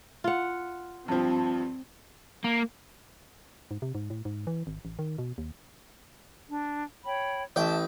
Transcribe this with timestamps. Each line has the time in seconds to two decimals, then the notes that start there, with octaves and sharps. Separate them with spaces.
0.24 F4 F#5
1.08 G2 F3 C4
2.44 A#3
3.71 G#2
3.82 C3
3.95 G#2
4.10 A2
4.25 G#2
4.47 E3
4.67 G#1
4.85 A1
4.99 D#3
5.19 B2
5.38 D#2
6.49 D4
7.04 C#5 G5 B5
7.56 A1 E5 G5 A5